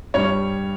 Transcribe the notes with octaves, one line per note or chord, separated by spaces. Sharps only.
G2 G3 C#5